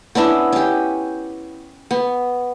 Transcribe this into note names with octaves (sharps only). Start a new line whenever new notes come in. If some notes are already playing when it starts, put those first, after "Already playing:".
B3 C#4 D4 E4
C#4 G4
B3